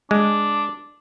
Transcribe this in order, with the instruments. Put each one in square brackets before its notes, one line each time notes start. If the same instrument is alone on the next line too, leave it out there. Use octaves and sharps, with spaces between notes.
[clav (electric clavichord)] G#3 [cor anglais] D4